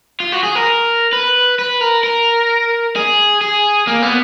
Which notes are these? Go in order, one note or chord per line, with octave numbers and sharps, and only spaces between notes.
F4
F#4
G#4
A#4
B4
B4
A#4
A#4
G#4
G#4
A#3
B3